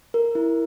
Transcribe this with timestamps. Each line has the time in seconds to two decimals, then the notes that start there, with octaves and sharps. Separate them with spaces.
0.14 A#4
0.35 E4